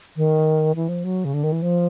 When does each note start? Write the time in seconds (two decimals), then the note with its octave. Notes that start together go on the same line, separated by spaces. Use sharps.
0.16 D#3
0.75 E3
0.89 F3
1.04 F#3
1.25 C#3
1.34 D3
1.44 D#3
1.52 E3
1.62 F3